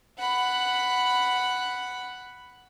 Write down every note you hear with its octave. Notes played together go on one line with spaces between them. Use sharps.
F#5 B5